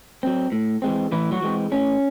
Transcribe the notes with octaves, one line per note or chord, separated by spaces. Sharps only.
F#3 C4
A2
E3 G#3 C4
A2 E3 E4
F#3 F#4
E3 G#3 C4
A2 C#4